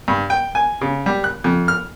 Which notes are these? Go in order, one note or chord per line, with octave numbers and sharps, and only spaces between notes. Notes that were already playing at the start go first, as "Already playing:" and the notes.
G2
G5
G#5
C#3
G3
F#6
F2
F6